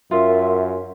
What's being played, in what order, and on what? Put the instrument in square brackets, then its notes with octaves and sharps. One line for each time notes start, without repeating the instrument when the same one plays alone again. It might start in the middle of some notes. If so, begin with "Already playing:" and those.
[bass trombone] F#2 [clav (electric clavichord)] F4 [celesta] A#4 C6 [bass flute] E5